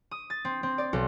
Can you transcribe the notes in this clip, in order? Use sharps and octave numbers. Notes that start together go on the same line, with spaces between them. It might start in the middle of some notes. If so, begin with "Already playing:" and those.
D#6
A6
C4
C4
D5
B1